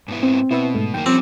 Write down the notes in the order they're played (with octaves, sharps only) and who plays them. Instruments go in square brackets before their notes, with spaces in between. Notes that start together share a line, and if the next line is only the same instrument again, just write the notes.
[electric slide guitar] G#2 B3 E4
[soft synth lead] C4
[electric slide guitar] B2 [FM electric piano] E4 B4 E5
[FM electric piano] G#2 A3
[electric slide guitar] F#2 A#3 [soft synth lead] D#3 [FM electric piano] G5
[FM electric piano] F3 [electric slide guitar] G3 C#4 [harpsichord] C4 [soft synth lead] D6